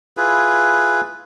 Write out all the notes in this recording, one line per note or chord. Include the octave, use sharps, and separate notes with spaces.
E4 F4 G#4 B4